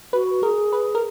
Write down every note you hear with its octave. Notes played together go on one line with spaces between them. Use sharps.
F#4 B4
G#4 A#4
B4
A#4